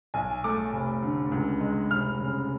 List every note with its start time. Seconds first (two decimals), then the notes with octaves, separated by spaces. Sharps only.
0.14 B1 G#5
0.44 A3 D6
0.73 F1
1.02 D3
1.32 C#2
1.61 G#3
1.91 F1 F6
2.20 C#3